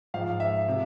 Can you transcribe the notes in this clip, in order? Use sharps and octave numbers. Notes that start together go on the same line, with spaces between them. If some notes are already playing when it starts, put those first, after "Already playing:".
G#2 F3 F5
E5
C3